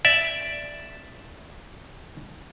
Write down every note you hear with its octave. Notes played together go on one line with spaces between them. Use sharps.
D5 E5